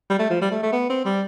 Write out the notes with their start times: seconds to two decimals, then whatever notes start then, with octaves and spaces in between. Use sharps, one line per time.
0.10 G3
0.19 A3
0.30 F3
0.41 G3
0.51 A3
0.63 A3
0.72 B3
0.89 C4
1.05 G3